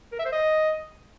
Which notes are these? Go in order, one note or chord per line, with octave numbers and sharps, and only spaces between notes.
A#4
E5
C5
D#5